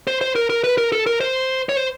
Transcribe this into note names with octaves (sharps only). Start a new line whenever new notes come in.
C5
C5
A#4
A#4
B4
A#4
A4
A#4
C5
C#5
C5